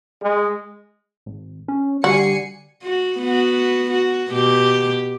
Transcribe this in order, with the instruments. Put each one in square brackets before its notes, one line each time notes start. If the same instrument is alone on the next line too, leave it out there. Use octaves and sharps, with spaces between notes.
[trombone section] G#3
[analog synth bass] G#1
C#4
[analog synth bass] D3 [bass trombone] G3 [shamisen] F#4 [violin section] G#5 C7 C#7
[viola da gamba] F#4
B3 F#4
F#4
B2 G4